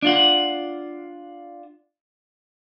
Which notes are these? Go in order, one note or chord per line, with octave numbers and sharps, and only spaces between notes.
D4 F4 F#5